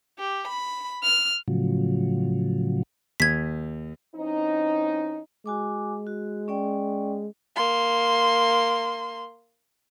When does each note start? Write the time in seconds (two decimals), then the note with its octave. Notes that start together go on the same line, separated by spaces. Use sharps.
0.19 G4
0.48 B5
1.03 F6
1.48 A2 C#3 F3 F#3
3.20 D#2 G#6 B6
4.16 E3 C4 C#4 D#4
5.46 G#3 F#4 G#5 D6
6.07 F#4
6.48 C#4 D5 G5
7.56 A#3 C6